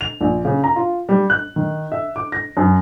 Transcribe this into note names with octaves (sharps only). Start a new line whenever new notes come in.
F7
A#1
C#3
A#5
F4
G3
F#6
D#3
E5
D6
A#6
F#2